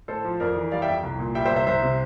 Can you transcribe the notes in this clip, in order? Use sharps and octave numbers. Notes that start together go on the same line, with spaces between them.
A2 A4 C5
F3
F2 A#4 D5
E3
G3 D5 F5
E5 G5
F2
C2
A#2
G3 E5 G5
C5 E5
C2
C5 E5
C2 C5 E5
C3